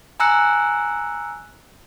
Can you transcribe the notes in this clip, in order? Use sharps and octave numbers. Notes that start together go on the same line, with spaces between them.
G#5 A#5 E6 F#6 C#7